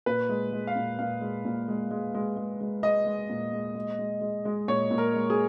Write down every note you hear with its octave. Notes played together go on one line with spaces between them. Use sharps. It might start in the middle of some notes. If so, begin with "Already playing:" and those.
A#2 B4
G#3
G#3
F5
A#2
A#2 F5
G#3
A#2
G#3
G#3
G#3
G#3
G#3
G#3 D#5
G#3
A#2
G#3
G#3
G#3
G#3
G#3
A#2 C#5
A#2
A#4
G#3
G#4